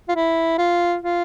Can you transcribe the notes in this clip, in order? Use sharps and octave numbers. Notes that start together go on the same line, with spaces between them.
F4
E4
F4
F4